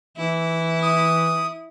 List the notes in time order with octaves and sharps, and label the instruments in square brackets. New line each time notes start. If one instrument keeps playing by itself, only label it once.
[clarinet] E3 [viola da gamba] E4
[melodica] D#6